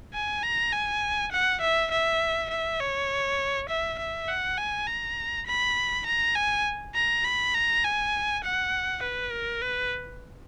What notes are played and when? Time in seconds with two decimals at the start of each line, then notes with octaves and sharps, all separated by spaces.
0.14 G#5
0.43 A#5
0.72 G#5
1.32 F#5
1.61 E5
1.91 E5
2.50 E5
2.80 C#5
3.69 E5
3.99 E5
4.28 F#5
4.58 G#5
4.87 A#5
5.47 B5
6.06 A#5
6.35 G#5
6.95 A#5
7.24 B5
7.54 A#5
7.84 G#5
8.43 F#5
9.02 B4
9.32 A#4
9.62 B4